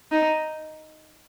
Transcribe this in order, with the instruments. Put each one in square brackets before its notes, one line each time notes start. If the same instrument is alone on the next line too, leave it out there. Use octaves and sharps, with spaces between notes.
[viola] D#4